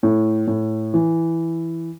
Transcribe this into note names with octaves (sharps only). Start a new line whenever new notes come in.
A2
A2
E3